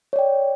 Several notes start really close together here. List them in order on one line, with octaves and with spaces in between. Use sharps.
C#5 D5 G5